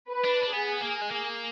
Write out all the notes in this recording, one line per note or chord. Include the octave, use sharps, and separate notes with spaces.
B4
D4
D4
B3 G#4
A#3
G#3
A#3